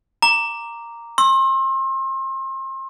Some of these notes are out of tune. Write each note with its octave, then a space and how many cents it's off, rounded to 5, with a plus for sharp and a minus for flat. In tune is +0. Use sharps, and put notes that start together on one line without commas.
A#5 -5 D6 +0
C6 +35 E6 +0